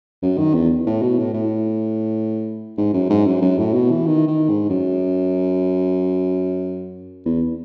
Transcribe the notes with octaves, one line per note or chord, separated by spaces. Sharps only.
F#2
D#3
E2
A2
B2
A2
A2
G#2
F#2
G#2
F#2
F#2
A2
B2
E3
D#3
D#3
G#2
F#2
E2